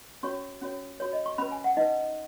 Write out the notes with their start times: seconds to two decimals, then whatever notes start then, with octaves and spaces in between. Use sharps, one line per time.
0.23 C#4 F#4 C#5 C#6
0.61 C#4 F#4 C#5
1.00 F#4 C#5
1.13 D#5
1.26 C#6
1.38 C#4 B4 B5
1.51 G#5
1.64 F#5
1.77 D#4 B4 D#5